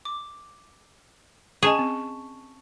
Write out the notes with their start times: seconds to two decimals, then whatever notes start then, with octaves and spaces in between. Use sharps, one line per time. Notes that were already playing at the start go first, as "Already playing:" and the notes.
0.05 D6
1.63 C#4 G#4 D#5 G#5 A5 C#6
1.79 C4